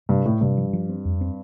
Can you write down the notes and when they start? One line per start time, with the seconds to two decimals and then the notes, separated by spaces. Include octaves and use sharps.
0.09 G2 C3
0.25 A2 A3
0.41 G2 C3
0.57 F3
0.73 F3
0.89 C4
1.05 F2
1.21 C4